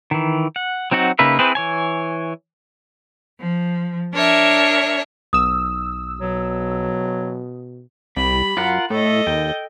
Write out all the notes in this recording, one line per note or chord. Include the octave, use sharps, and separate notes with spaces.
D#3 E3
F#5
F#3 C4 D#4 F#4 F#5
C#3 A#3 D#4 B4 E5
C4 E4 G#4 B4 C5
E3 C#5 G#5
F3
D4 A#4 C#5 E5
B1 D#6 E6
B2 F#3
C2 G3 B5
F#2 F4 A#4 F#5
A2 A3 A4 D#5
D#2 G5